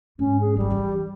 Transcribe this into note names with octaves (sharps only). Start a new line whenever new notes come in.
G#2 C#4
G#4
G#1 F#3 G3
E3 C#4